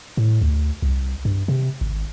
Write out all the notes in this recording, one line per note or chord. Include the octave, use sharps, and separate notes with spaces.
A2
D2
C2
G2
C3
G#1